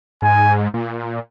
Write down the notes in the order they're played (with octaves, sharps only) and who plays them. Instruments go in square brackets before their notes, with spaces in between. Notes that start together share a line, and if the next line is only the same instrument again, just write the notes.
[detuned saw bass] G#2 [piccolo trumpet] G#5
[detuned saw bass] A#2